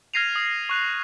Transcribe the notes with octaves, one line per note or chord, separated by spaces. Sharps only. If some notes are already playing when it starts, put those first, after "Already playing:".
F6 G#6 A#6 C7 D#7 F7
D#6
C#6 F#6 F7